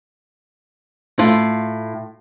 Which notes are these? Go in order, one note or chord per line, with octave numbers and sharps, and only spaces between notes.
A2 F4